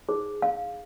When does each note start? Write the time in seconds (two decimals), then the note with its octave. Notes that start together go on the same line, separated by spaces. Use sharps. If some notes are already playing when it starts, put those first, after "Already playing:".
0.08 D#4 G#4 C5
0.42 F5